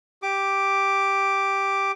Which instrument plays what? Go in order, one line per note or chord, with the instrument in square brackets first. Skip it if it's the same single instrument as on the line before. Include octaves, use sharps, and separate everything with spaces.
[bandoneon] G4 D6